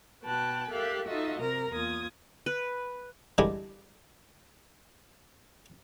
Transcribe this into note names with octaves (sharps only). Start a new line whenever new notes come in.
B2 F#4 B4 G5 A5 F#6
G4 A4 A#4 E5 F5 F#6
D#4 F4 F#4 A4 D#5 E5
C3 A#4 A#5
E2 A#3 F4 D#6 G#6
B4
D3 E3 G3 G#3 G4